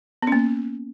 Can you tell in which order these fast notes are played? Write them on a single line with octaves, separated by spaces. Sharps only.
B3 C#4 A#3